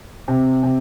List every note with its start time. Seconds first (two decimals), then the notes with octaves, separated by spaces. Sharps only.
0.28 C3
0.63 C3